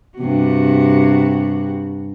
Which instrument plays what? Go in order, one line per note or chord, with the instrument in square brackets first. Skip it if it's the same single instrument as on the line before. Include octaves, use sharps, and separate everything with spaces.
[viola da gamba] G2 C3 F#4